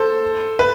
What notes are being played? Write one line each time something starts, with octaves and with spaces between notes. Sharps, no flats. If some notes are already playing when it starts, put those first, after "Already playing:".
Already playing: A4 C5
B4